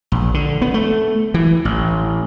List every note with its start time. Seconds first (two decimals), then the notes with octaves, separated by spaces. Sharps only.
0.12 A#1
0.34 D3
0.62 B3
0.74 A3
1.34 E3
1.65 A1